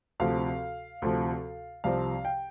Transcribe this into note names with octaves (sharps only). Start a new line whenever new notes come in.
D2 C3 F3 F5
D2 C3 F3
C2 C3 F3 C4 F5
G5